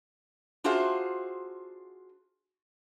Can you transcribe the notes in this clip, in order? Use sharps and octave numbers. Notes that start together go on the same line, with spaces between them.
D4 F4 F#4 G#4 C5 E5